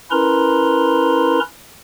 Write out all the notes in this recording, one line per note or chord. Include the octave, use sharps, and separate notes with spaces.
C#4 E4 A#4 B4 A#5 C6